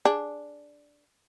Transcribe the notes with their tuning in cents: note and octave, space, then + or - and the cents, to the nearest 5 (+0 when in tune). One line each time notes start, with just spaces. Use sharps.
D4 +0 G#4 +0